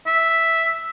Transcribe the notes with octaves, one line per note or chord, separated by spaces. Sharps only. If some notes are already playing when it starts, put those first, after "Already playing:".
E5